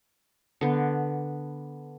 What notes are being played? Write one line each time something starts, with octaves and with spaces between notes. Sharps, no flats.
D3 B3